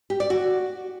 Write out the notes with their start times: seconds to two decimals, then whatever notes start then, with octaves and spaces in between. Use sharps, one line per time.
0.10 G4
0.20 D5
0.30 F#4